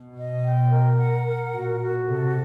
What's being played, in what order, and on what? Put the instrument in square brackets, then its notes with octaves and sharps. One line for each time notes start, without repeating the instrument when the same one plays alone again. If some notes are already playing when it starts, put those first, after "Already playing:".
Already playing: [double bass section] B2
[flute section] D#5
G5
A#4
F#5
A#4
[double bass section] A#2 [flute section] F#4
[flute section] F#4
[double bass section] C3 [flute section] A4